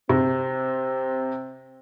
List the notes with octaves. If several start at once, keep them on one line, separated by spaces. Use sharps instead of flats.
C3 C4